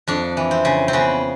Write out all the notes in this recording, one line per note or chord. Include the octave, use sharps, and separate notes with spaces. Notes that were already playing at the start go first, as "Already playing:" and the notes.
F2 D4
E3
C4
C#3
C4
C#3 B3